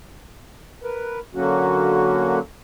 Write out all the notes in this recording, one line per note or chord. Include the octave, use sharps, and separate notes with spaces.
A#4 B4
D3 F#3 A#3 C#4 F#4